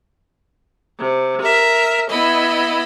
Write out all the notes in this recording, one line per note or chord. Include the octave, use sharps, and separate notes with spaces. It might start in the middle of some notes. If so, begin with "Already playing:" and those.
C3
A#4 E5
B3 E4 D#5 B5